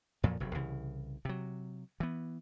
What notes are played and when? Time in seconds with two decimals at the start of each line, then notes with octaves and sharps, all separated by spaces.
0.23 F2 A#2 F3 F#3
0.40 F1 C3 F#3
0.55 C2 C#3 E3
1.25 C3 F#3
2.00 E3 B3